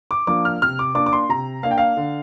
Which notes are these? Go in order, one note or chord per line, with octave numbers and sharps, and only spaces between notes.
D6
F3 A#3 D4 D6
F6
C3 F6
D6
A#3 D4 D6
D6
C6
C3 A#5
A#3 D4 F5
G5
F5
D3